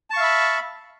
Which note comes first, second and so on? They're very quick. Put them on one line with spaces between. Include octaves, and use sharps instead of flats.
A5 C#6 F5 E5 B5